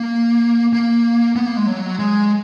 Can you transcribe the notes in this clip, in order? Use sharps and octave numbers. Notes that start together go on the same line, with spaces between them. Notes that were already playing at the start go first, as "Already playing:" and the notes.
Already playing: A#3
A#3
B3
A#3
G#3
F#3
G#3